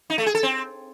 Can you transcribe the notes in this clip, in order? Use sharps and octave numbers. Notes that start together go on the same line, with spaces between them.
D#4
A3
G#4
A4
C4